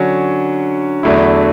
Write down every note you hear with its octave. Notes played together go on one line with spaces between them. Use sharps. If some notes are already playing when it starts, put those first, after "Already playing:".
Already playing: D3 F#3 C#4
E2 D3 F#3 A3 E4